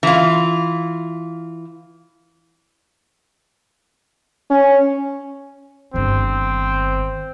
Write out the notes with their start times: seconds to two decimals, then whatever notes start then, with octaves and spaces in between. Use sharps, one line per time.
0.03 E3 F4
4.50 C#4
5.94 G1 D#3 C4